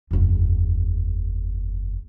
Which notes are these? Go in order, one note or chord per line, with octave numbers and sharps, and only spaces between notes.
F#1 E2